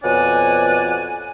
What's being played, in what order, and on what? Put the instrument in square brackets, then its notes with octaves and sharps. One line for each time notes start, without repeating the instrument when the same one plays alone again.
[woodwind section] F2 B2 C#5 D5 F#5 G#5